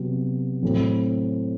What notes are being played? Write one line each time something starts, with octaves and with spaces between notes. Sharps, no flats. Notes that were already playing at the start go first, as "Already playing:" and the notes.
Already playing: C3 F#3 B3
A2 F#3 A3 C4